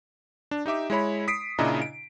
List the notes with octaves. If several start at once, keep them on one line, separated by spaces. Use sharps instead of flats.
D4
D#4 G4 E5 D6
G#3 E4 C#5 B5
D#6 B6 C7 D7
A#2 C#3 D4 E4 D#5 A#5
D7